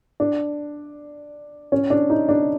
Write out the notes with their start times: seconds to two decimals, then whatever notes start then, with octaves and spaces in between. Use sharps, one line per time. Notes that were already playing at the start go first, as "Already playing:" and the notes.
0.20 D4
1.72 C#4
1.90 D4
2.10 D#4
2.29 D4